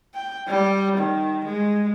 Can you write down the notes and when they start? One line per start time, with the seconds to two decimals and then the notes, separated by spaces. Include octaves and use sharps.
0.14 G5
0.48 G3
0.97 D#3
1.45 G#3